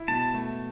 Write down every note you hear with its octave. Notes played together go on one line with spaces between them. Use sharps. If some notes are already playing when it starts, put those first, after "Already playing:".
Already playing: E4
B2 A5
A3